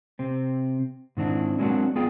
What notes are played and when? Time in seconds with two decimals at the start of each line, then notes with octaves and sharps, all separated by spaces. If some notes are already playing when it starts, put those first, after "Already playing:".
0.19 C3 C4
1.17 G#2 D#3 C4 D4 E4
1.58 F#3 G#3 A#3 C4 D4 F#4
1.96 B3 F4 G#4 D5 G5